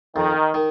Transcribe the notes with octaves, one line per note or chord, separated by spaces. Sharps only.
F2 D#3
D#3